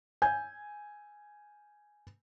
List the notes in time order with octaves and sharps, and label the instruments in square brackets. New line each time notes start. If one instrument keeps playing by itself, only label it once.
[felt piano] G#5 G6